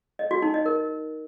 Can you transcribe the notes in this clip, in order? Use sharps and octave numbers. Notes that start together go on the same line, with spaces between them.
D#5
F#4
D#4
D#5
A#4